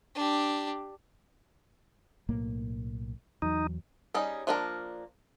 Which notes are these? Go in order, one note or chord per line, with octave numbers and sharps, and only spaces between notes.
D4 G4
B1 A2 A#3
E2 F#3 D#4
G3 C#4 D#4 G#4
F3 A#3 D4 G#4 A#4